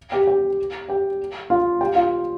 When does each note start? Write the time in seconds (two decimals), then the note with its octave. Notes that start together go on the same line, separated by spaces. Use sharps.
0.12 G4 G5
0.27 G4 G5
0.88 G4 G5
1.50 F4 F5
1.81 G4 G5
1.95 F4 F5